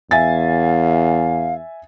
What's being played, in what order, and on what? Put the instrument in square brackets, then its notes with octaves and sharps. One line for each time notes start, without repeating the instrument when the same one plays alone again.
[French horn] E2 [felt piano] E5 G#5 A6 [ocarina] F5